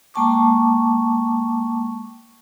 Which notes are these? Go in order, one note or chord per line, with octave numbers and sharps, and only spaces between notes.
G#3 A#3 G5 A5 C#6 D6